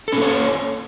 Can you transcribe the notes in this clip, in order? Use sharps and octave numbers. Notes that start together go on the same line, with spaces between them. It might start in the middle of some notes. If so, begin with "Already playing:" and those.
A#3 C#4 A4 C#5